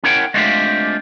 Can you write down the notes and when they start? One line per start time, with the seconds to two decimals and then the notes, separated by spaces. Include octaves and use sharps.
0.04 C#4 E4 A#4 C#5 F#5 G5
0.34 G#3 A3 C4 D4 F4 G4